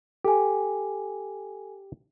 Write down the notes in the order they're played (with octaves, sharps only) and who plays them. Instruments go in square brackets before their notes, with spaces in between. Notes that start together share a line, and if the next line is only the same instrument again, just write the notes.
[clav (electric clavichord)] G4 [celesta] A4 G#5